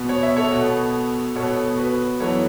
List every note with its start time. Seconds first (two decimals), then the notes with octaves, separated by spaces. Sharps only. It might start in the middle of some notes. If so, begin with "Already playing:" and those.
Already playing: B2 B3
0.09 C#5
0.23 E5
0.37 A4 C#5
0.52 B2 B3
1.35 B2 B3 A4 C#5
1.78 F#4 B4
2.20 F#2 E3 B3 A4 C#5